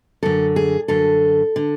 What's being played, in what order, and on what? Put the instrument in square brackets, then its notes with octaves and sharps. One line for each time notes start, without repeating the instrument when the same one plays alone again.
[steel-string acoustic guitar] F#2 D3 A4
G#4
F#2 D3 A4
D3